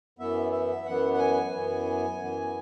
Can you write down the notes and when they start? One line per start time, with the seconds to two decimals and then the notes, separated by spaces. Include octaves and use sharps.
0.19 F#2 E3 B3 E5
0.52 E5
0.86 F#2 E3 B3 F#5
1.13 F#5
1.19 G#5
1.53 F#2 E3 B3
2.19 F#2 E3 B3